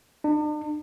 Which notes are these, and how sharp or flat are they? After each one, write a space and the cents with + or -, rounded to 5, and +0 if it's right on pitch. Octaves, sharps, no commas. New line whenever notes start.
D4 +45